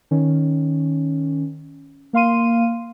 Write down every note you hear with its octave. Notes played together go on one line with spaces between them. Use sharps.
D#3 C#4
A#3 F5 C6 D#7